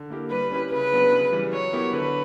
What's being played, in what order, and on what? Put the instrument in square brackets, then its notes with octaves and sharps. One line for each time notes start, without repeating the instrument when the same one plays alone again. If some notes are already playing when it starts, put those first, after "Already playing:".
Already playing: [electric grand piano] D3
A#3 E4 G4 A#4
[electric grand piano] G3 [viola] B4
[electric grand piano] C#4 E4 G4
[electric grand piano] C#3 [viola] B4
[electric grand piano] F#3 B3 D4
C#3
E3 G3
[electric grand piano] F#3 [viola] C#5
[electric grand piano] B3 E4 G4 A#4
[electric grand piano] D3 [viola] B4